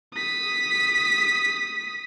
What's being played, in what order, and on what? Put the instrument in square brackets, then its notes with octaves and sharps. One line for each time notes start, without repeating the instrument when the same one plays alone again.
[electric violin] D#6 B6